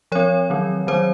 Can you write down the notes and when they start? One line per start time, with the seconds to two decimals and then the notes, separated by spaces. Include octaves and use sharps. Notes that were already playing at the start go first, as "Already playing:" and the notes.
0.12 F3 C4 C#5
0.50 D#3 F#3 C4
0.87 D#3 F#3 C4 C5